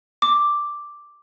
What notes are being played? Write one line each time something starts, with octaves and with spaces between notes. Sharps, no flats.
D6